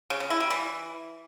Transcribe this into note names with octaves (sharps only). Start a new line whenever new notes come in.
C#3
C#3
E4
G3
E3